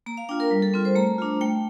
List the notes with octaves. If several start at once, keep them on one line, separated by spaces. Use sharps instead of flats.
A#3 A#5
F5
D4 F4 G5
A#4
G3
A4
C4 F4
C5
A3 A#5
D4 F4
A3 G5